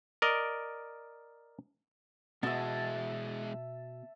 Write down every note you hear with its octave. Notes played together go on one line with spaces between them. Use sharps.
A#4 D5 D#5
E2 B2 G#3 E5 A5